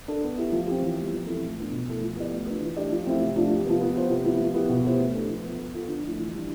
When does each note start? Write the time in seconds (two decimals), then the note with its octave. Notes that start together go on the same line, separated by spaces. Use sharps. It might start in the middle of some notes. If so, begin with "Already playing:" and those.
0.08 D4 A4
0.24 B3
0.37 E4 G4
0.52 F3
0.67 C4 G4
0.82 E3
0.98 G3 B3
1.13 F3
1.27 C4 E4 A4
1.42 A2
1.57 F3 B3 D4
1.72 B2
1.87 A3 E4 A4
2.02 F3
2.17 B3 E4 G4 D5
2.32 A3
2.47 D4 F4 B4
2.61 E3
2.76 A3 D4 G4 D5
2.91 F3
3.06 A3 C4 E4
3.21 C3
3.36 F3 A3 D4
3.50 C3
3.65 F3 B3
3.80 B3
3.96 F4 C5
4.10 C3
4.24 F3 B3 E4
4.40 F3
4.54 B3 E4 G4
4.69 B2
4.84 B3 E4 G4 C5
5.00 A3
5.15 D4 A4
5.29 F3
5.45 B3 F4
5.59 B3
5.74 F4 A4
5.89 D3
6.03 F3 A3 E4
6.19 E3
6.33 G3 D4